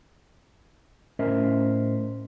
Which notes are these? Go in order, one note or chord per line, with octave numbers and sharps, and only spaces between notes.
A2 C#4 A#4 C5 D#5 E5